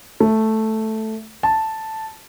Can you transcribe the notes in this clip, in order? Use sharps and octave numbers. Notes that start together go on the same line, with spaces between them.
A3
A5